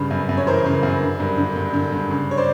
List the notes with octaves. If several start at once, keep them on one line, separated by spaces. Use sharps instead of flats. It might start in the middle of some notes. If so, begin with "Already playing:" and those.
Already playing: G2 C#3 B4
F#2
F#2
C#5
E3 A#4 C5
C#3
F#2
D3
G2
D3
G2
D3
G2
C#3
C#5
C5 D5